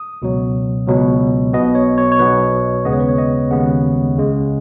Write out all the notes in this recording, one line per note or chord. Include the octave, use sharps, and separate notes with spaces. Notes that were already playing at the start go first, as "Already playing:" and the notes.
Already playing: D#6
C#2 B2 F#3
C#2 B2 F#3
B1 B2 B3 D#5
C#5
C#5
C#5
B1 B2 B3 B4
D#2 C#3 G#3 B3 D#5
C#5
B4
C#5
D#5
D#2 C#3 G#3 B3 F#5
C#2 C#3 G#3